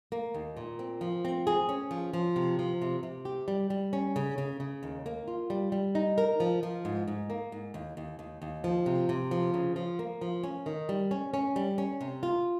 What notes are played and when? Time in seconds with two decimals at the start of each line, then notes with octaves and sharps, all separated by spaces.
0.12 A#3
0.34 D#2
0.57 A#2
0.79 C4
1.01 F3
1.25 C4
1.47 G#4
1.69 C#4
1.91 F3
2.13 F3
2.36 C3
2.59 F3
2.82 C3
3.03 C3
3.25 G4
3.48 G3
3.70 G3
3.93 C#4
4.16 C#3
4.38 C#3
4.60 C#3
4.83 D#2
5.06 A#3
5.28 F4
5.50 G3
5.72 G3
5.95 D#4
6.18 A#4
6.40 F3
6.63 F3
6.85 G#2
7.08 G#2
7.30 A#3
7.52 G#2
7.74 D#2
7.97 D#2
8.19 D#2
8.42 D#2
8.64 F3
8.86 C3
9.09 C3
9.31 F3
9.54 C#3
9.76 F3
9.99 A#3
10.21 F3
10.44 C#4
10.66 D#3
10.89 G3
11.11 C#4
11.34 C#4
11.56 G3
11.78 C#4
12.01 C3
12.23 F4